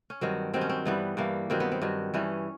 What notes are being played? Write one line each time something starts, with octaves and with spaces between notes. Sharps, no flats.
C#4
G2 D#3 F#3 C4
G2 D#3 F#3 C4
C#4
C4
G2 E3 G3 B3
G2 E3 G3 A#3
G2 D#3 F#3 C4
B3
C4
G2 D#3 F#3
G2 E3 G3 C#4